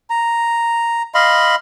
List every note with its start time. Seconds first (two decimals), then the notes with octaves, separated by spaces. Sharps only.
0.10 A#5
1.14 D#5 F5 B5 C6